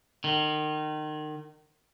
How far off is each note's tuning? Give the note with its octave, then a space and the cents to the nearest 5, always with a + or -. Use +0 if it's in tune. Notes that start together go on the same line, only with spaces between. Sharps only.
D#3 -30